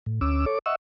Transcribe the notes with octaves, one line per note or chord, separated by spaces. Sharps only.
A2
D2 C#4 D6 E6
A4 C#5 D6
D#5 E5 F#5 C#6 E6